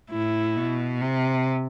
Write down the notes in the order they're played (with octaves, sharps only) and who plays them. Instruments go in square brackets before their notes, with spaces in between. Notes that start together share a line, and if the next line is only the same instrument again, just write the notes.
[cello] A2 [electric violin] E4
[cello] B2
C3